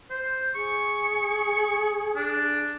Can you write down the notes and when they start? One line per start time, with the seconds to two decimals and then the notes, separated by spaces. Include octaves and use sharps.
0.10 C5
0.55 G#4 C#6
2.16 D4